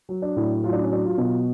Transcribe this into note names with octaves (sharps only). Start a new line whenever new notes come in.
F#3
D4
A2
F#3 F4
D4
C#4
F#3 D4
F4
B2